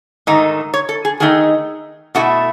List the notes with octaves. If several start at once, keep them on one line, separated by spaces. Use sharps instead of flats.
G#2 D#3 A3 D#4
C#5
A4
G#4
D#3 A3 D#4 G#4
B2 A3 E4 F#4